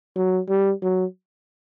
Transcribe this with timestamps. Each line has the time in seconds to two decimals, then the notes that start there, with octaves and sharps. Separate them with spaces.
0.16 F#3
0.49 G3
0.82 F#3